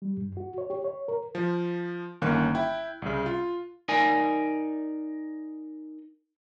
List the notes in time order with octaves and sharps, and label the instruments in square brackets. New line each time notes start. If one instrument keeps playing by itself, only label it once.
[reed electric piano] G3
G2
F#4
C#5
G4
C#5
A#4
[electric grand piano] F3
G1 D#3 A#3 C#4 F5 F#6
E4 G5
C2 C#3
F4
[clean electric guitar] D#4 A#4 D5 G#5